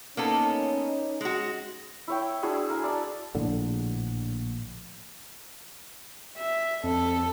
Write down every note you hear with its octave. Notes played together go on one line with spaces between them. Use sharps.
A#3 B3 C#4 D#4 A4
G#3 F#4
E4 C#5 G5
D4 E4 F#4 G#4
A#4 G#5
D5 A5
A#1 A2 D3
E5
F2 A4